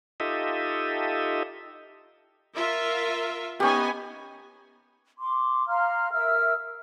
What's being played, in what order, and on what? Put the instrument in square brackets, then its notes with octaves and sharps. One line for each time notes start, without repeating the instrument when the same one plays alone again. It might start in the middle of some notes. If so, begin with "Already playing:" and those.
[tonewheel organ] D#4 F4 G4 A4 D#5 E5
[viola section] F4 A#4 E5
[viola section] B3 D#4 G#5 [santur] C#4 G4
[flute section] C6 D6
F5 A#5 C6 F6
A#4 E5 E6 F6